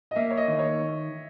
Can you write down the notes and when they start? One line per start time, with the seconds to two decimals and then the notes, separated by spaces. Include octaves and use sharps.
0.11 D#5
0.16 A#3 E5
0.30 C#5
0.37 D#5
0.48 D#3
0.59 C#5